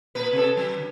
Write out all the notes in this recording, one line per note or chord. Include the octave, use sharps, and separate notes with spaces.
A#2 B4
C3 A4
F#3
D3